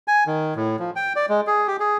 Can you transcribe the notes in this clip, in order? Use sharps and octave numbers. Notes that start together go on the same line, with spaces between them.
G#5
D#3
A2
F3
G5
D5
G#3
G#4
G4
G#4